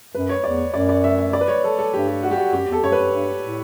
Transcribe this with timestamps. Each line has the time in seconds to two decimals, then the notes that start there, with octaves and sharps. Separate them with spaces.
0.14 F#2 B4
0.29 C#5
0.44 E2 D5
0.73 F#2 D5
0.89 D5
1.04 E5
1.18 E5
1.33 D5
1.41 B4
1.48 C#5
1.64 A4
1.79 A4
1.93 G2 G4
2.08 G4
2.23 F#4
2.31 G4
2.38 F#4
2.53 F#2 G4
2.67 E2
2.72 A4
2.83 F#2 C#5
2.92 B4
2.98 F#2
3.12 G2
3.41 A2